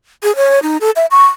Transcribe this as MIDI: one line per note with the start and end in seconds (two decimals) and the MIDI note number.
0.23 0.35 68
0.36 0.59 73
0.63 0.77 63
0.81 0.91 69
0.96 1.06 76
1.11 1.26 85